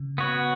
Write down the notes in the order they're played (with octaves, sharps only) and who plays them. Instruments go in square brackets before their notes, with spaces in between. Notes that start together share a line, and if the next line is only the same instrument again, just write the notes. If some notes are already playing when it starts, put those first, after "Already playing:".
Already playing: [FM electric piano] C#3
[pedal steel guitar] B3 F#4 C#5